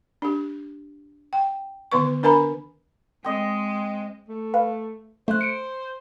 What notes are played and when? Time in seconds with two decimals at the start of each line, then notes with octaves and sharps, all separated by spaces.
0.22 D4 G4
1.33 G5
1.92 D3 D#3 B3 B4 C#6
2.23 D4 A#4 B4 G#5 A#5 B5
3.25 G#3 C4 D#5
4.29 A3
4.54 B4 F5
5.28 A3 C5 F#6
5.41 C#7 D7